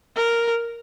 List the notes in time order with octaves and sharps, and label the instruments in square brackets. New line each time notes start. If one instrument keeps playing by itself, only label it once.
[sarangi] A#4